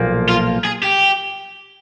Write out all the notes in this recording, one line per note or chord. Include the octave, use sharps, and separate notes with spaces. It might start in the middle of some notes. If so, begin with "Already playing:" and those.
Already playing: B1 A#2 F3 A#3
F4
G#4
G4